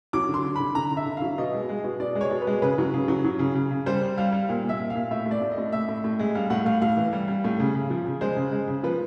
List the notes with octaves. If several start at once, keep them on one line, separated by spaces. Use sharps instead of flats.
F#3 D6
D3
C6
D3
D3 B5
D3 A#5
D3
E5
D3
F#3 F5
B2 D#5
G#3
G#3
B2
B2 D5
G#3
C#5
B2
B4
G#3
C#3 B4
F#3
C#3
F#3
F#3
C#3
C#3
C#3
G3 C5
G3
G3 F5
G3
A#2
A#2
E5
A#2
F5
A#2
A2 E5
A2
D5
A2
D#5
A2
A2 E5
A2
A2
G#3
G3 F5
A2 F#5
A2 F5
A2 F5
E3
G3
G3
A2
C#3
C#3
F3
C#3
G#3 C5
C#3
G#3
C#3
F3 B4